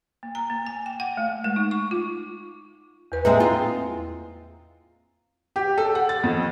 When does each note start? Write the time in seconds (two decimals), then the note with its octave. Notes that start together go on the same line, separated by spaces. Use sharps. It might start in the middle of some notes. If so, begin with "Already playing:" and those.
0.23 A#3
0.35 A#5
0.50 A#3
0.67 G#5
0.86 G5
1.00 F#5
1.17 A3
1.44 G#3
1.56 D#4
1.71 C#6
1.91 F4
3.12 E2 B4
3.25 G#3 A#3 C4 G#4 E5
3.40 E4 F4 A#5
5.56 G4
5.78 A4
5.95 F#5
6.09 A6
6.23 F2